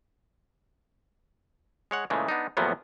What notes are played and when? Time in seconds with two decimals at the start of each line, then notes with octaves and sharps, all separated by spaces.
1.91 G#3 C#5 F#5
2.10 A#2 C#3 E3 G#3 A3
2.28 B3 D4 D#4
2.57 E2 A2 F3 F#3 A#3 B3